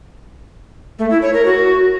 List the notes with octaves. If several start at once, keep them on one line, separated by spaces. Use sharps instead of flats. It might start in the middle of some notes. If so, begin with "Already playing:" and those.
A3
E4
C#5
A#4
F#4